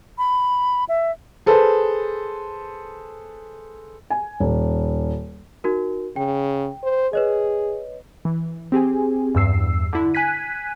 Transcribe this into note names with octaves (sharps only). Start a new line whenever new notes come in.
B5
E5
G#4 A4 B4 C5
G#5
D#1
D#4 F#4 A#4
C#3 G5
C5
G#4 B4 C#5 D#5
E3
C4 G4 G#4 G#5
E2 G2 E6 C7
D3 E4
G#5 F#6 G#6 B6 D#7